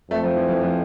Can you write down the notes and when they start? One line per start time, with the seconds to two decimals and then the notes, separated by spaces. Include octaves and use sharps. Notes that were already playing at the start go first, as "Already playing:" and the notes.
0.10 F2 A3
0.23 F3
0.36 E3
0.48 E3
0.61 F3